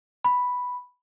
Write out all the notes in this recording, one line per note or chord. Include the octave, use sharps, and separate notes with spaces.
B5